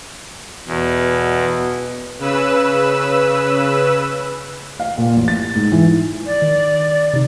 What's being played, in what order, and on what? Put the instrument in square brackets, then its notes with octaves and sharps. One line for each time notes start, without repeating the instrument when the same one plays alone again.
[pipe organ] E2 [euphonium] B2
[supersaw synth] C#3 B4 E6
[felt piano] F5
A#2
A1
A6
G#2
E3
[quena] D5
[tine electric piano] D#3
C3 D#4